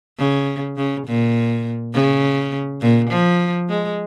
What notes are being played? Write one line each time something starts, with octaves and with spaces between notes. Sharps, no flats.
C#3
C#3
A#2
C#3
A#2
F3
G#3